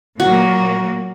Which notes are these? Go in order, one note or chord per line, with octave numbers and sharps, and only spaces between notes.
A#2 F#3 A#3 F#4